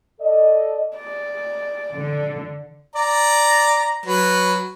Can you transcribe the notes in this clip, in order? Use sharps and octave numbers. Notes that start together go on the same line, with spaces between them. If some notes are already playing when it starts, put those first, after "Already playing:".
A4 D5 D#5
D5
D3
D5 A#5
F#3 B4